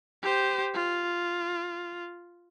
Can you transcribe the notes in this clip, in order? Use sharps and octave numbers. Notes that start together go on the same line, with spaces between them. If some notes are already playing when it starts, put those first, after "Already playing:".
G4 C5
F4